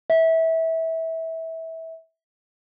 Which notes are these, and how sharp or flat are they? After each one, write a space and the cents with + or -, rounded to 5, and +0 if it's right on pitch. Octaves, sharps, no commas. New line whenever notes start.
E5 -20